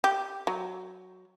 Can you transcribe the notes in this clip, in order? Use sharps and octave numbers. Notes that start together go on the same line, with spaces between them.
G4
F#3